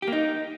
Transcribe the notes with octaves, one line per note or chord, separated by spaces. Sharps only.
G4
A#3
D#4